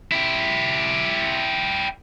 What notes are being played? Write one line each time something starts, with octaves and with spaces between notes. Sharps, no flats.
E4 G4